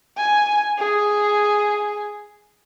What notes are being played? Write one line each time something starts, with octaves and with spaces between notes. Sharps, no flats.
G#5
G#4